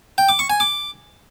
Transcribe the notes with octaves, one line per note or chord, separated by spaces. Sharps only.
G5
D6
C#6
G#5
D6